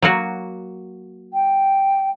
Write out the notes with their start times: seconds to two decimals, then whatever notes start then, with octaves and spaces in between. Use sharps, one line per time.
0.02 F#3 A#3 F#4
1.34 G5